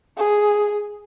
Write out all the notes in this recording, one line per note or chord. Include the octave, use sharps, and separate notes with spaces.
G#4